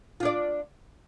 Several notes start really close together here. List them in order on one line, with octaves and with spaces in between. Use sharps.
F4 D4 D5